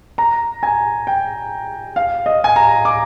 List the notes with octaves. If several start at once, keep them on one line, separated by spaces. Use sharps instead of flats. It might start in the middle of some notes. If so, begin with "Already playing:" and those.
A#5
G#5
G5
F5
D#5
G#5
A#5
D6